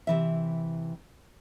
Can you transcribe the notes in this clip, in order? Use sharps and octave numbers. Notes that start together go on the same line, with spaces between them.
C3 E3 E5